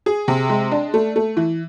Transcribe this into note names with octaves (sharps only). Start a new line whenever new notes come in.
G#4
C3
G#3
D4
A3
A3
E3